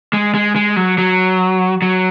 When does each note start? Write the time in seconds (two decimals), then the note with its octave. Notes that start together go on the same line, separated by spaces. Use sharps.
0.13 G#3
0.34 G#3
0.56 G#3
0.76 F#3
0.98 F#3
1.82 F#3